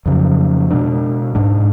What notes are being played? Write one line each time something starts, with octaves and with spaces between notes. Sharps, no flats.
F2 C#3 F#3
B2 G#3 D4
G#2 G#3 D4